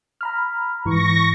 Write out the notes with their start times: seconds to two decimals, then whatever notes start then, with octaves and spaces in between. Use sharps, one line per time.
0.21 A#5 B5 F6
0.86 G#2 E3 C#6 A#6